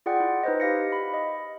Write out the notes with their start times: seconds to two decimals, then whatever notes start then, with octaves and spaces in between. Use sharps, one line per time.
0.06 F4 G#4 D5 F#5 G5
0.20 E4
0.43 D#4 B4 C5 D#5
0.60 G4 F5 A#6 C#7
0.92 B5
1.14 D#5